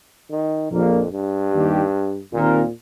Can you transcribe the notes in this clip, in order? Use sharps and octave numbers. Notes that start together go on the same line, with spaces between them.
D#3
A#1 F2 A#2 A#3
G2
D#2 D#3 G3 D#4 G4
D#2 A#2 D#3 C4 F4 A#4